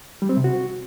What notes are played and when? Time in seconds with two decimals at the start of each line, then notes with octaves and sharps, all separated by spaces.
0.22 G3
0.29 C4
0.37 C3
0.44 F#4